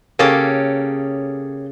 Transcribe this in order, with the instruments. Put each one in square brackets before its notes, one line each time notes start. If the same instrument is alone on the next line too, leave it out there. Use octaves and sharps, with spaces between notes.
[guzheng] C#3 A4 [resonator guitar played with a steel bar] A#3 C#4 G4